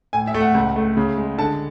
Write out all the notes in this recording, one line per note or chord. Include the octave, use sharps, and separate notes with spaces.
A2 G#5
E5
A3
F#5
C#2
A3
C#3
G#3
D3 A5